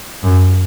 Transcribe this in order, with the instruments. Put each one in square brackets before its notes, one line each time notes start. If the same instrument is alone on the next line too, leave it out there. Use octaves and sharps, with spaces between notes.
[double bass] F#2